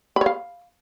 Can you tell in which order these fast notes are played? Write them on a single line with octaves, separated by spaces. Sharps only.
B5 C#5 F5